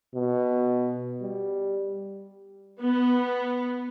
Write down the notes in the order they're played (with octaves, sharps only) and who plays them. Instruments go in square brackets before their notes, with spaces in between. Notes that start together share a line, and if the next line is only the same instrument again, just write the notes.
[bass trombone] B2
G3
[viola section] B3